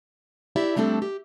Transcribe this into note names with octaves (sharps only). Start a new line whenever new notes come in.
E4 G4 D5 E5
G3 A3 C4 D4 A4
G4